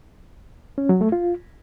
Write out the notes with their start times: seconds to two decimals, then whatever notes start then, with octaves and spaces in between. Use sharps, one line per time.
0.78 C#4
0.89 F#3
1.01 A3
1.12 F4